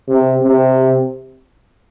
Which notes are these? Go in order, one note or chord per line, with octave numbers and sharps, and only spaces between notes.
C3
C3